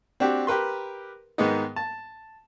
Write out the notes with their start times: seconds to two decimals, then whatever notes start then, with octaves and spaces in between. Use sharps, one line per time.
0.20 C4 D4 F#4 G4
0.47 G4 A#4 B4 C6
1.38 G#2 D#3 G#3 B3 D#4
1.76 A5